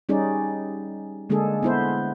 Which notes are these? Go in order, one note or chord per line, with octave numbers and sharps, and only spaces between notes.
G3 C#4 D#4 G#4 D5
D3 G#3 A#3 D4 G#4 A4
B3 E4 C5